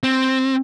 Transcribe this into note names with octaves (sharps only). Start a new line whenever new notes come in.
C4